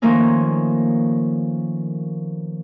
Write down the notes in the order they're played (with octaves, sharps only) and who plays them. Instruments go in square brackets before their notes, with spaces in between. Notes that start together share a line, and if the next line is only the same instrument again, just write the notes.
[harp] D#3 F3 A3 A#3 C#4 D#4